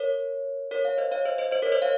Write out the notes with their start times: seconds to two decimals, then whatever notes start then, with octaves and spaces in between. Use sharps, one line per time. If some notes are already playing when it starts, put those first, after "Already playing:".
Already playing: A#4 C#5
0.71 A#4 C#5
0.85 C#5 F5
0.98 C5 D#5
1.11 C#5 F5
1.25 C5 D#5
1.38 C5 D#5
1.51 C5 D#5
1.62 A#4 C#5
1.72 C5 D#5
1.82 C#5 F5